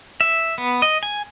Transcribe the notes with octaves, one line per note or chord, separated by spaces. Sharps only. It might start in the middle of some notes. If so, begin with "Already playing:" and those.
E5
B3
D#5
G#5